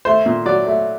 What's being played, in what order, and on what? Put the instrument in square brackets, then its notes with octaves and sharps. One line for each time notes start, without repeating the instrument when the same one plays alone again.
[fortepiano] A3 C5
A#2
F#3 D5
A3